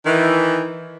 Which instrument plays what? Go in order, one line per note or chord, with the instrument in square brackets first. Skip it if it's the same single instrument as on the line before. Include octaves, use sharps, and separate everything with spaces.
[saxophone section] D#3 E3